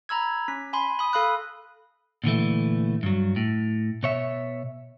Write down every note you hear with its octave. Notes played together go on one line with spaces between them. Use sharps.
A#5 B5 E6 G#6
C#4 B6
G#5 B5 C6
B5 D#6
A4 F5 B5 D#6 F#6
A#2 D3 E3 A3
G2 F#3
A2
B2 C#5 E5